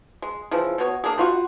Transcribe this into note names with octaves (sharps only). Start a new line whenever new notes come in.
G#3
C#3 E3 F3
B2 B3 C#5
A#3 D4 G#4
G3 F4 F#4